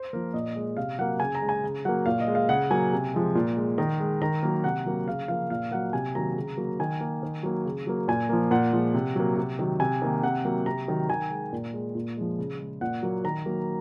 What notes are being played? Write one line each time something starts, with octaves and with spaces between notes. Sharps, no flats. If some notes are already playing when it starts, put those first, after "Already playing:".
Already playing: C5
F3 A#3 A#4
A#2 D#5
G#3
C3 F5
F#3 A#3 F#5
C#3 G#5
A#5
G#3
G#5
C#3
F#3 A#3 F#5
A#2 F5
D#5
G#3
F5
C#3 F#5
F#3 A#3 G#5
C3
F3 G#3
A#2
G#3
D#3 A#5
G#3
D#3 A#5
F#3 A#3
C3 F#5
F#3 A#3
C#3 F5
F3 A#3 F5
A#2 F5
F#3 A#3 F#5
C3 G#5
D#3 F#3 A#3 A#5
C#3
F#3 A#3
D#3 G#5
A#3
D#3
F#3 A#3
C#3
F#3 A#3
A#2 G#5
F3 A#3
A#2 F#5
F3 G#3
C3
F#3 A#3
C3
D#3 F#3
C3 G#5
D#3 A#3
C3 F#5
F#3 A#3
C3 A#5
D#3 F#3
D#3 G#5
G#3
A#2
G#3
A#2
F3 G#3
C#3
G#3
A#2 F#5
F#3 A#3
D#3 A#5
F#3 A#3